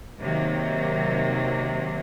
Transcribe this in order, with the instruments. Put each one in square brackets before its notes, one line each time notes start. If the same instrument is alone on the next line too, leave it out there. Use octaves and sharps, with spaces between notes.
[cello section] C3 D#3 F#3 A#3